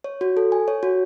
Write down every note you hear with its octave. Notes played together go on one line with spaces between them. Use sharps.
C#5
F#4
A4
G#5
C#5
F#4